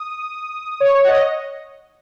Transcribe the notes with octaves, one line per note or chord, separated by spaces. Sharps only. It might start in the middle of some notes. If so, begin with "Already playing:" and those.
Already playing: D#6
C#5
C#5
F#5
D#5